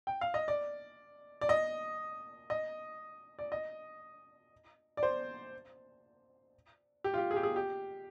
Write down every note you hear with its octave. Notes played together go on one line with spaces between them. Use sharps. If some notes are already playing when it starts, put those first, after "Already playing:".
G5
F5
D#5
D5
D5
D#5
D#5
D5
D#5
D5
C5
G4
F4
G4
G#4
G4
G#4
G4